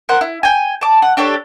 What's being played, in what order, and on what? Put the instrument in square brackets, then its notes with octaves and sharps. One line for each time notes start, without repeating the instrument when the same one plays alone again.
[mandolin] A#4 C5 F#5
E4
G5 G#5
A5 D6
F#5
D4 G4 A4 C#5